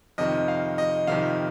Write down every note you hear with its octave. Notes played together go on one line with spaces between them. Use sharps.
F2 C3 D#3 D#5
F5
D#5
F2 C3 D#3 F5